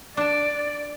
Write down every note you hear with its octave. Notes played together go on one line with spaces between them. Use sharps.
D4 D5 A5